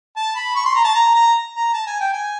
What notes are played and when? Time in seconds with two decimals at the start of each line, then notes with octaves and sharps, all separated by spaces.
0.16 A5
0.35 B5
0.56 C#6
0.65 C6
0.75 A#5
0.84 A5
0.95 A#5
1.15 A#5
1.55 A#5
1.73 A5
1.87 G#5
2.00 G5
2.13 G#5